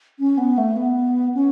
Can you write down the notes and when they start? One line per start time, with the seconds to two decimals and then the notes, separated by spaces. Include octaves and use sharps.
0.19 C#4
0.38 B3
0.58 A3
0.76 B3
1.35 C#4